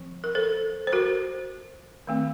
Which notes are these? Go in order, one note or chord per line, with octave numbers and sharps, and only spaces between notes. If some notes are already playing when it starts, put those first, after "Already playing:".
Already playing: F3 C4
A#4
A4 C5
C5
F#4 A#4
D#3 A3 C4